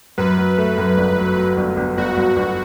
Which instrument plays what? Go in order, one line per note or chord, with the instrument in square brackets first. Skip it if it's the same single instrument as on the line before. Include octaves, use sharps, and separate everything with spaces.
[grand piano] F#2 [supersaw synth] B4
[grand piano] F#3
A3
F#2
G1
F#3
F#3
G1
G1
[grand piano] G1 [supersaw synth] F#4
[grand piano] G1
G1